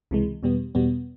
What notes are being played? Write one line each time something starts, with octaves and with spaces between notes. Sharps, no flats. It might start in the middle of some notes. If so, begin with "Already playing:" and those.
C#2 C3 E3 G#3
E2 B2 G3 B3
E2 B2 G3 B3